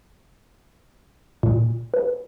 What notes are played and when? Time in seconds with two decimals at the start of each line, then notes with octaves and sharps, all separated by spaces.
1.43 A#2
1.94 B4